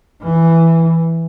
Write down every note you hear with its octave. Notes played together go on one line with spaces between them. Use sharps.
E3